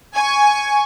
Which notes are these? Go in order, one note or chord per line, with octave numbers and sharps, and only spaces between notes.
G#5 C#6